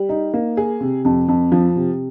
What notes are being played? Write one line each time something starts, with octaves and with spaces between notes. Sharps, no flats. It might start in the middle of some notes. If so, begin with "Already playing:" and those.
Already playing: G3
D#4
A#3
G#4
C3
F2
F2
F3
C3